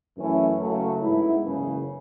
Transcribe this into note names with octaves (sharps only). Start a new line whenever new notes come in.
F#2 E3 A3 C#4 E4
F#1 F#2 C#3 F#3 A3
G#2 G#3 B3 E4
F#1 E2 C#3